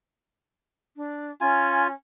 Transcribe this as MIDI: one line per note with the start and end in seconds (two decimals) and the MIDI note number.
0.96 1.31 62
1.41 1.93 61
1.41 1.87 65
1.41 1.87 80